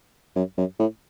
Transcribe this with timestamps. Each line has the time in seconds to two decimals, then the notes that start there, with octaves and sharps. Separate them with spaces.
0.36 F#2
0.57 F#2
0.79 A2